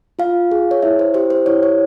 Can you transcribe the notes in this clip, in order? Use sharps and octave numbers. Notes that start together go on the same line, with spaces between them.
F4 F5
G#4
C#5
E4 E5
C5
G4 C5
C5
E4 C#5
C#5